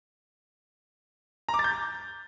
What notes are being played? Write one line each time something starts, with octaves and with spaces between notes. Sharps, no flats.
A#5
D6
A6
G6